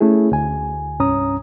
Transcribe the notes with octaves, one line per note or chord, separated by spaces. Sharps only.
A3 C#4 E4 G#4
D2 G#5
C2 G2 C#4 A#5 D#6